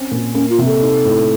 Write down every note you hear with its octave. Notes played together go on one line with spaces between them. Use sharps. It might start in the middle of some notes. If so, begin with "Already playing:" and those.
Already playing: C4 C#4
A#2
A#3 C#4
F4
C3
A4
D#4
A2